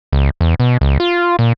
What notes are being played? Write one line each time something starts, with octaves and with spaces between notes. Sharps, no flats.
C#2
E2
B2
C#2
F4
A#2